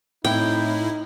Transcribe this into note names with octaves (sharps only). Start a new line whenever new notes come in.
A2 A3 C4 D#4 E4 G5 B5